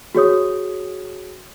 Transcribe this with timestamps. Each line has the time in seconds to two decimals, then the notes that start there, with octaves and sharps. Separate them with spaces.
0.15 F#4 G#4 C#5 D#6